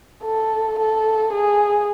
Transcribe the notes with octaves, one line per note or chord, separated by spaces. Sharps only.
A4
A4
G#4